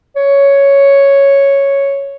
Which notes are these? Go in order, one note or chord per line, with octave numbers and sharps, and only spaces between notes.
C#5